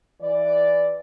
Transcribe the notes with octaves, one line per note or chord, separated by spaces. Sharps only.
E3 D5